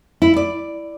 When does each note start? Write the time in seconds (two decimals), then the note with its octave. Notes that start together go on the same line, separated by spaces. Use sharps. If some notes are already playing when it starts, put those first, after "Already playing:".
0.22 E4
0.36 D5